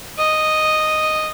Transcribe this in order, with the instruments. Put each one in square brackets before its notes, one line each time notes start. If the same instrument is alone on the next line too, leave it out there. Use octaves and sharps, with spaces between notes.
[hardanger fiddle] D#5